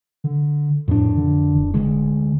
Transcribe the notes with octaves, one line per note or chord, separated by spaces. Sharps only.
D3
F2 A2 D4
D3
D1
D2 D3 G#3